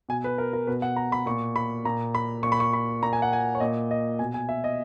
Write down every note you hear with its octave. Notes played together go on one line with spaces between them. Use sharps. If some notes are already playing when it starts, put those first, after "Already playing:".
B2 G#5
B4
A#4
A#4
B2 B4
F#5
A#5
B5
A#2 C#6
B5
A#2 A#5
B5
A#2 C#6
B5
C#6
B5
A#2 A#5
G#5
F#5
G#5
C#5
A#2 D#5
D#5
B2 G#5
G#5
E5
D#5